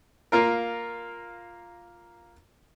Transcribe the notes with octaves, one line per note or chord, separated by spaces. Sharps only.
A#3 F4 A#4